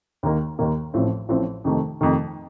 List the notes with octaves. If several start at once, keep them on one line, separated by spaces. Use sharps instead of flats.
D#2 D#3 A#3
D#2 D#3 A#3
A1 A2 F3 C4
A1 A2 F3 C4
F2 C3 D#3 A3
F2 C3 D#3 A3